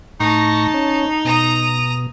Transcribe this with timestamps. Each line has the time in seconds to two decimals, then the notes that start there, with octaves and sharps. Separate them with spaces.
0.20 A2 D#4 A5 C#6 A#6
0.74 C#4
1.25 B2 A#5 D#6